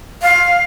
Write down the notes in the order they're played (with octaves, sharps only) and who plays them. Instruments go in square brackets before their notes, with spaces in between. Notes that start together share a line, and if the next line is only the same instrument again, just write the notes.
[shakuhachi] F5